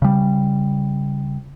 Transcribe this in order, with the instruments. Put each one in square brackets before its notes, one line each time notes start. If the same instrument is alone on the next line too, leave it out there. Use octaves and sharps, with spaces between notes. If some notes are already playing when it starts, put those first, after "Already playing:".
[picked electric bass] C#3 G3